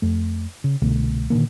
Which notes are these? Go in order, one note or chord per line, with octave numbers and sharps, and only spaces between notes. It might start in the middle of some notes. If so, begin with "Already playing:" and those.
F2 A3
C#3
C2 B2 D3 A3
A#2 D3 D#3 A#3